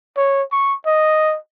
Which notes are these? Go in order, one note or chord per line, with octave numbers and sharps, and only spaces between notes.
C#5
C#6
D#5